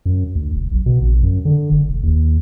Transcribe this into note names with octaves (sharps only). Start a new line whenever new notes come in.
F#2
D2
E1
B1
B2
A#1
F#2
D3
F#1
E1
D#2